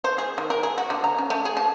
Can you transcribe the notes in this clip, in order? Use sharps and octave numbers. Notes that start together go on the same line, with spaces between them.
C5
G#4
D#3
A#4
G#4
F#4
D3
A#5
C#4
A3
G#4
A5